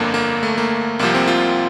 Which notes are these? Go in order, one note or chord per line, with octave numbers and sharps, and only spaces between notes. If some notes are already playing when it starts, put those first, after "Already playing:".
Already playing: G1 F2 D3 A#3
A#3
A3
A#3
C2 C3 F3 A#3
C4
F4